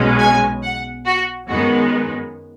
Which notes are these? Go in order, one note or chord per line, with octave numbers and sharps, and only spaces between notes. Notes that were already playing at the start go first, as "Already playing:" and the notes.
Already playing: B1 B2 G#3 C#4
G#5
F#5
F#4
F#2 D#3 G#3 B3 F#4